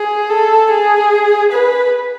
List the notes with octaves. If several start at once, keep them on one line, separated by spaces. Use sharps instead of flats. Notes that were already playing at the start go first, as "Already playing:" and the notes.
Already playing: G#4
A4
G#4
B4